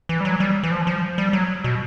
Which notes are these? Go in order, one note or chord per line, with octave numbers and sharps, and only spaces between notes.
E3
G3
F#3
G3
E3
F3
F3
G3
F#3
B2